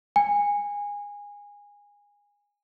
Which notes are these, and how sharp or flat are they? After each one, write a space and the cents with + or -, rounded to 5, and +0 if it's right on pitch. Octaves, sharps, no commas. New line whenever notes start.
G#5 -20